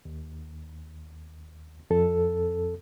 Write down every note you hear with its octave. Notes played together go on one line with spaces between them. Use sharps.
D#2
F2 A4